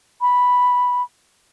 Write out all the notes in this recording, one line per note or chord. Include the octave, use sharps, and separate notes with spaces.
B5